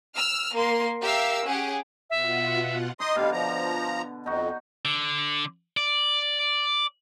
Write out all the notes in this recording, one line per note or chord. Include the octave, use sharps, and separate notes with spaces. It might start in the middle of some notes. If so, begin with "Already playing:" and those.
E6 F6
A#3 C6
G4 A#4 E5 F5 E6
C#4 G4 G#4 F#5
B2 F4 E5 F#5
D#4 D#5 C6 D6 D#6
B2 D3 G3 F5
F3 A#5
F2 D#4 F#4
D3
D5